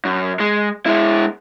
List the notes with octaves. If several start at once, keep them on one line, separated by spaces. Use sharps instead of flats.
F#2
G#3
G#3 E4